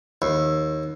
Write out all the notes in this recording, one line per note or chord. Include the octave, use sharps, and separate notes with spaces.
D#2